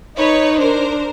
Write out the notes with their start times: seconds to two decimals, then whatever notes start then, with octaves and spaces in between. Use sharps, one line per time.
0.17 D#4 B4 C#5
0.58 D4 A#4 C5